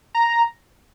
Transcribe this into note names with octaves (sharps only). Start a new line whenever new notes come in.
A#5